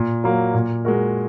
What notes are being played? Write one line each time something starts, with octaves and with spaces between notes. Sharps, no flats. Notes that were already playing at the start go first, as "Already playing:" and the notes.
Already playing: A#2
F#3 A#3
A#2
G#3 F#4 A#4